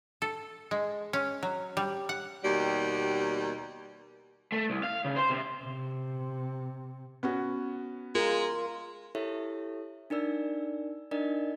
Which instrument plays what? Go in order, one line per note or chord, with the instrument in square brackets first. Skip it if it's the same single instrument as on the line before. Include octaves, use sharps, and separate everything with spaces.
[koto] A4
G#3
C#4
F#3
G3
F#5
[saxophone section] D#2 B2 G3
[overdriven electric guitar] A3
C2
F5
C#3
C5
C3
[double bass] C3
[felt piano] B3 C#4 F#4
[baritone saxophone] G#3 [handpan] F4 A#4
[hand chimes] E4 G4 A4 C#5 E5
D4 D#4 A#4 D5 E6
D4 D#4 A#4 D5 D#5